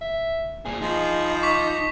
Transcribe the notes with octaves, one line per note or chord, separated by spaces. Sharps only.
E5
D2 A#2 G#4
F3 D#4
C#6 D6 B6